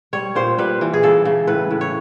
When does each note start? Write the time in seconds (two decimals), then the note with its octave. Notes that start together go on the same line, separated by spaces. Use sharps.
0.13 G3 C#5
0.35 A#2 C5
0.58 G3 B4
0.81 E3
0.93 G#4
1.03 C#3 A4
1.25 C#3
1.47 A2 B4
1.71 A2
1.81 C#5